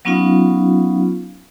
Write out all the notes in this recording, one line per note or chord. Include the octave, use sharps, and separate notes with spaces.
F#3 B3 C#4 D#4 F4 F5